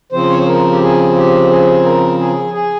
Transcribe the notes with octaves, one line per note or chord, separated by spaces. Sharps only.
C#3 F3 C4 C5
C#5
C5
A#4
G4
G#4
G4
G#4
A#4
G#4
G#4